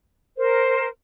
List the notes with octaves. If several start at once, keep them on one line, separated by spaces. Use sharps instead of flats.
A#4 C5